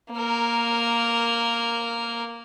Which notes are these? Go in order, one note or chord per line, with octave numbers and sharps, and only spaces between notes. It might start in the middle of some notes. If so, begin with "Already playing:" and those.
A#3 A#4